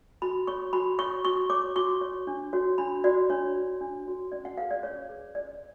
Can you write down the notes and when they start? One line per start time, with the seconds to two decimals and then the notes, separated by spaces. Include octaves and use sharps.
0.22 F#4 B5
0.47 C#5 C#6
0.73 F#4 B5
0.99 C#5 C#6
1.24 F#4 C#6
1.50 C#5 D6
1.76 F#4 C#6
2.01 C#5
2.27 D4
2.53 F#4 C#5
2.78 D4 B5
3.04 F#4 C#5 D5
3.30 D4 C#5
3.56 F#4 C#5
3.81 D4
4.06 F#4 C#5
4.32 C#4 D5
4.45 F#5
4.57 G#4 B4 F5
4.71 D5
4.83 C#4 C#5
5.09 G#4 B4
5.35 C#4 D5